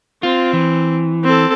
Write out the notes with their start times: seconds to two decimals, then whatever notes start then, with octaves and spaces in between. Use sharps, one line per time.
0.23 C4 F4
0.53 E3
1.24 C4 A4